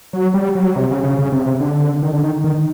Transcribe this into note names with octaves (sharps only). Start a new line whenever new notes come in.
F#3
G3
F#3
C3
C#3
C#3
C#3
C3
C3
D3
D#3
D3
D#3
D#3